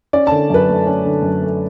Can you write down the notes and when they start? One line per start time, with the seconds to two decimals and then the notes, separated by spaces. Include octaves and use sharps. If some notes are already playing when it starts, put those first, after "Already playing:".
0.13 C#4 D5
0.27 D3 A5
0.50 F#2 B4
0.68 A3
0.86 C#4
1.05 D3
1.23 F#2
1.41 A3